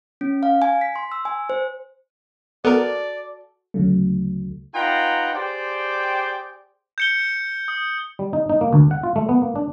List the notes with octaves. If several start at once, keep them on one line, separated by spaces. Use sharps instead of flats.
C#4
F5
G#5
B6
C6
E6
G#5
C5
B3 F#4 A4 A#4 D5
D2 C#3 F#3 A3
D#4 F4 B4 F#5 G5 A#5
G4 G#4 C5 D5 G5
G6 C#7 G7
D#6
G3
D#4
D#4
A#3
D2
F#5
F4
A3
B3
A#3
D4